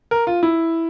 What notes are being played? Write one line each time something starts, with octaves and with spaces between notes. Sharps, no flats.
A#4
F4
E4